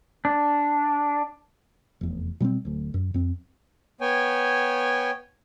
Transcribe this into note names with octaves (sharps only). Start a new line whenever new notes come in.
D4
F1 E2
B2 G3 A3 C4
D1 D2
F#2
F2 C4
B3 C#5 G5 G#5